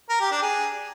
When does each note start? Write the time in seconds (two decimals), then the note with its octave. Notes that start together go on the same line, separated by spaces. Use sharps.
0.09 A#4
0.20 G4
0.31 D4
0.42 G#4